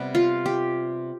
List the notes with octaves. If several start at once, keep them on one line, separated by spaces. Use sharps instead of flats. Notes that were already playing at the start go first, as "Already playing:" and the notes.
Already playing: C3 G3 B3
F4
G4